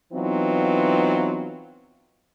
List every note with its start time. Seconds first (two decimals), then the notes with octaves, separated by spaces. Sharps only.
0.13 E3 F#3 B3 C4 D#4 F4